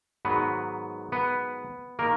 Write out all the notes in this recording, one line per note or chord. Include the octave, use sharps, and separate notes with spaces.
G#2 D#3 F#3 B3 B4
B3 B4
D#3 A#3 A#4